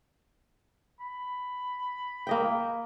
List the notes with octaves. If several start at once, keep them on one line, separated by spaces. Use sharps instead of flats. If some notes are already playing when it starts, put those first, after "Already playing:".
B5
A#3 D#5 G5